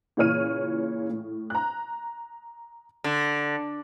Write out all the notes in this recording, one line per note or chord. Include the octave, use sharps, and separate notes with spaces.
A#2 C#3 E3 C#5 F6 D#7
A2
A#5 F#6
D3